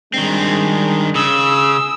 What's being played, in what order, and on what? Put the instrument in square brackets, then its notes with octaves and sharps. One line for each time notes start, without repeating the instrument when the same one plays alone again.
[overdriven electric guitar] D#3 C4 [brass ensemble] G3 G#3 D4
[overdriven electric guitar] C#3 [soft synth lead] D#6 [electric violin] E6